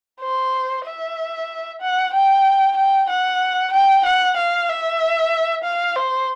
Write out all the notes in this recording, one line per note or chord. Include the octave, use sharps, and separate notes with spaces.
C5
E5
F#5
G5
G5
F#5
G5
F#5
F5
E5
F5
C5